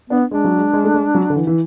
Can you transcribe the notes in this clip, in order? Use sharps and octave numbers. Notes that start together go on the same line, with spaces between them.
B3 D4
G#3 D4
F#3
G#3
G#3
A3
G#3
F#3
D3
E3
E3